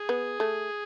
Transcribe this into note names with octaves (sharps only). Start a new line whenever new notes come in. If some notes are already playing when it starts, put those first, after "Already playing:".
Already playing: G#4
B3
A3